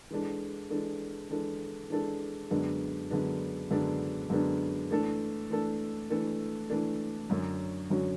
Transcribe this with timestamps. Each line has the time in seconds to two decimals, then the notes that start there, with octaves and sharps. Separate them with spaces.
0.11 E3 G#3 D4 A4
0.70 E3 G#3 D4 A4
1.30 E3 G#3 D4 A4
1.90 E3 G#3 D4 A4
2.50 F#2 D3 G#3 B3 D4
3.10 F#2 D3 G#3 B3 D4
3.71 F#2 D3 G#3 B3 D4
4.30 F#2 D3 G#3 B3 D4
4.91 E3 A3 D4 A4
5.50 E3 A3 D4 A4
6.10 E3 A3 D4 A4
6.70 E3 A3 D4 A4
7.30 F#2 D3 F#3 C#4 F#4
7.90 F#2 D3 F#3 C#4 F#4